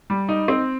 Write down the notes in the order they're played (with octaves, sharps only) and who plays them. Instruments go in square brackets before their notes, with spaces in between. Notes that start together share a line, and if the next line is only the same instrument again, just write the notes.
[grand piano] G3
D#4
C4